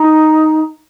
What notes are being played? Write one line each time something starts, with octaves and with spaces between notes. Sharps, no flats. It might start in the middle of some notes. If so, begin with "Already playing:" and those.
Already playing: D#4